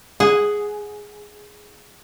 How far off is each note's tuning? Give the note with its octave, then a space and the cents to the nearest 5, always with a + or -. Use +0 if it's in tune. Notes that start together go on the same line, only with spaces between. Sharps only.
G#4 +0 F#5 +0